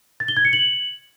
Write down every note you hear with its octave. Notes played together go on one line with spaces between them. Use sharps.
A6
G7
G#6
C#7
F#7